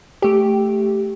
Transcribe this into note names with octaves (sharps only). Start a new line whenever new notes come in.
A3 G4